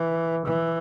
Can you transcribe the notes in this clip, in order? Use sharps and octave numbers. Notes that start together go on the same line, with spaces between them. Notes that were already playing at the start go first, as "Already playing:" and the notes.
Already playing: E3
E3